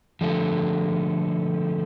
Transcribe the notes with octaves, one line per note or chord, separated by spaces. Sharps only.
D3 F3 A3